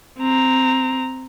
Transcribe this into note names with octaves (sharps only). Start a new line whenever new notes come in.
C4 A#5